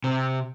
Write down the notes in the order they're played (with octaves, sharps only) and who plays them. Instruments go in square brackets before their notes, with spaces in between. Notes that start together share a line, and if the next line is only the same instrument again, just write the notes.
[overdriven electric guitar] C3